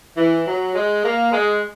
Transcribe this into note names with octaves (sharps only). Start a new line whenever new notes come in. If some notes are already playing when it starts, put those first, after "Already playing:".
E3
F#3
G#3
A#3
G#3